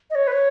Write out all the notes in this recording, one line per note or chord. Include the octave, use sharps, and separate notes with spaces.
D#5
C#5
B4
C#5